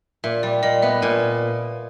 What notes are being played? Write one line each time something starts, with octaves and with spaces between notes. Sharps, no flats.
A#2 E5
G3 D5
A#2 D#5
B3 E5
A#2 G#5